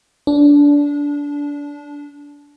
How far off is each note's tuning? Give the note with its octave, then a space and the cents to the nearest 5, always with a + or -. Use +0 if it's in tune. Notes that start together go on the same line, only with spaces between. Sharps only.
D4 -20